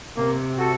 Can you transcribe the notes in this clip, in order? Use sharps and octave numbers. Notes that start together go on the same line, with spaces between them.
C3 A#3
F#4 A4